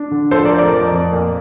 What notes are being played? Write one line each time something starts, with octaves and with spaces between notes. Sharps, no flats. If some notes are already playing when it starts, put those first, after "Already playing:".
Already playing: D4
D3
F3 A4 C5
A#4 D5
F3
A#4 D5
F2
F2
A#2